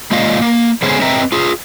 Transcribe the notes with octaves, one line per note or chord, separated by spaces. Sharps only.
G#3 A#3 F4 D5 D#5 F5
A#3
D3 G#3 B3 C#4 G#4 C5
C4 B4 D#5 E5 G5 A#5
F4 G#4